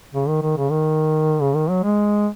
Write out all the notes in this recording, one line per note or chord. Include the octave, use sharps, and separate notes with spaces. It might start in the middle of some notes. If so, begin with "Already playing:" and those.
C#3
D#3
D#3
C#3
D#3
C#3
D#3
F#3
G#3